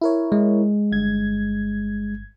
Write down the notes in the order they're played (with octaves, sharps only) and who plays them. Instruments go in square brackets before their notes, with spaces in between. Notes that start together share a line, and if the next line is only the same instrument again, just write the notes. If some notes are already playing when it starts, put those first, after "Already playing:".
[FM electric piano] E4 A#4 C#5
[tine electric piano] G#3
[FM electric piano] G1 G2 G#6